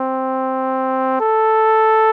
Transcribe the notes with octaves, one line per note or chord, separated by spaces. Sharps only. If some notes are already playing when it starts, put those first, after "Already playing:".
Already playing: C4
A4